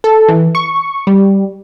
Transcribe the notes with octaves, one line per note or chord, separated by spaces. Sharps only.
A4
E3
C#6
G3